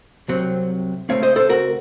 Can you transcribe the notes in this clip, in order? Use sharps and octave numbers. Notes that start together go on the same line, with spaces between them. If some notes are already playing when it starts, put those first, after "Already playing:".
C2 C3 F#3 C4
C#2 C#3 A3 C4 C#5 F5
C5 D#5
A4 C5
F#4 A#4